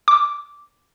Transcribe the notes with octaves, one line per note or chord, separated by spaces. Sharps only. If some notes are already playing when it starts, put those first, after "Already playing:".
D6